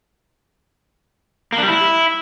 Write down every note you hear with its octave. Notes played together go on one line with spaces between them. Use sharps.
A#3
D4
G3
E4